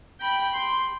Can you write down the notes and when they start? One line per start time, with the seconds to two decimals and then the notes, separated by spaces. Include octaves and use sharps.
0.20 G5 B5
0.54 C6